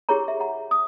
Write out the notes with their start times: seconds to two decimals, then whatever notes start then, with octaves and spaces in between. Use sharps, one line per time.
0.09 E4 G4 G#4 A#4 C#5 A#5
0.28 E5
0.40 F#5 A#5
0.71 D#6